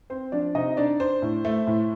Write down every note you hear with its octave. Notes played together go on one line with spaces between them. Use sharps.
C4 C5
F3 D4 D5
C3 D#4 D#5
D4 D#4 D5
D4 C5
A2
A3
A2